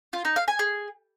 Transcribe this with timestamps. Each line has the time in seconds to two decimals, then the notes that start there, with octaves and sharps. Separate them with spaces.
0.13 F4
0.25 D#4
0.36 F5
0.48 G#5
0.59 G#4